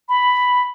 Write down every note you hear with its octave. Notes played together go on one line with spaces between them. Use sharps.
B5